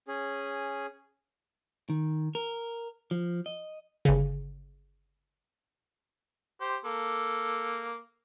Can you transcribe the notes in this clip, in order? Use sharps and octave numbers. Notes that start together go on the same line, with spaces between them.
C#4 G#4
D#3
A#4
F3
D#5
G1 C#3
G4 C5
A#3 A4